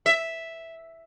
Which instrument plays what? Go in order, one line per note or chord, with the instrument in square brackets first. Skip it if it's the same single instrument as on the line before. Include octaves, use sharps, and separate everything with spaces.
[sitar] E5